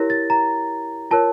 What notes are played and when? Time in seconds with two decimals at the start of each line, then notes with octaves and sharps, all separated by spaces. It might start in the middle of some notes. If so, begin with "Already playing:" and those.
Already playing: E4 G4 A#4 C#5 A#6
0.10 A6
0.30 A#5
1.11 F4 A#4 C#5 A5